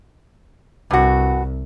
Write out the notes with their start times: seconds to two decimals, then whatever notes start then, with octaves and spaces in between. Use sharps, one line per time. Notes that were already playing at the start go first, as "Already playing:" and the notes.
0.91 C2 G2 F#4